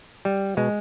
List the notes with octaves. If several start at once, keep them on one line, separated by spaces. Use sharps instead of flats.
G3
B2 G#3